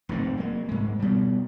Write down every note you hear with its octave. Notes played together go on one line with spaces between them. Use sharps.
F1 G#2 D#3 C4
F#3 A#3
G#2 G#3
B2 G3